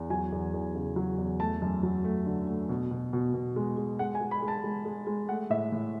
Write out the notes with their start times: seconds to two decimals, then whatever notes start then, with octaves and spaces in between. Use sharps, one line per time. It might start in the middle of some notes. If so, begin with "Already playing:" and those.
Already playing: E2
0.10 F#3 G#5
0.32 E2
0.54 E2
0.75 C#3
0.96 F#3
1.18 E2
1.40 A3 A5
1.62 F#2
1.83 F#3
2.04 A3
2.26 D3
2.48 A3
2.69 B2
2.91 B2
3.13 B2
3.34 B2
3.56 G#3
3.77 G#3
3.99 G#3 F#5
4.15 G#5
4.21 G#3
4.31 B5
4.42 G#3
4.48 A5
4.64 G#3
4.85 G#3
5.07 G#3
5.28 A3 F#5
5.50 A2 E5
5.72 A2